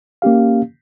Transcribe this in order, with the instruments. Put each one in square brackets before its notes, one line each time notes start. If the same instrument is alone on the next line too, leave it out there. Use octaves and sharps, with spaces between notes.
[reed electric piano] A#3 C#4 G4 F5